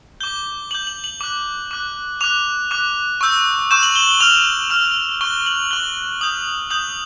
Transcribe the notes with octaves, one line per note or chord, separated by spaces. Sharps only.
D6 G6 G7
D6 G6 F#7
F#7
F#7
D6 F#6
D6 F#6
D6 F#6 F7
D6 F#6
C#6 E6 G6
C#6 E6 G6 E7
F#7
G7
G7
C#6 F6 F7
C#6 F6
C#6 F#6 G7
F#7
C#6 F#6 G7
D#6 G6 F#7
D#6 G6 F#7